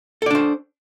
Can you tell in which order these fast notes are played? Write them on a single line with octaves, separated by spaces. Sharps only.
A4 D5 D4 C5